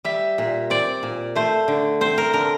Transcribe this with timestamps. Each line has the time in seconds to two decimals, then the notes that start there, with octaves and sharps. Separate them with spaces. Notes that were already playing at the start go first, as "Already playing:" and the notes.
0.04 G3 E5
0.38 A#2
0.70 C4 D5
1.03 A#2
1.36 A3 C5
1.68 D3
2.01 C4 C5
2.18 A#4
2.34 D3 A#4